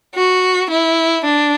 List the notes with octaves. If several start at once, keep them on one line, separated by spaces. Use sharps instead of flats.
F#4
E4
D4